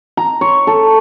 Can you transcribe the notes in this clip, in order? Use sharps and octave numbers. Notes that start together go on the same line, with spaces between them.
A#5
C#5
A4